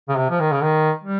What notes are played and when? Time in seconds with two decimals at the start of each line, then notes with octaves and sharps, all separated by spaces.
0.09 C#3
0.17 C3
0.30 F3
0.40 D#3
0.52 C#3
0.63 D#3
1.04 G3